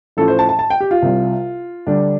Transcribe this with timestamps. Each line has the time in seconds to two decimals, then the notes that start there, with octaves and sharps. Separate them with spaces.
0.17 A1 A2 F3 A4
0.28 C5
0.39 A5
0.49 A5
0.59 A5
0.70 G5
0.81 G4
0.91 F4
1.02 C2 C3 G3
1.87 D2 D3 G3 D4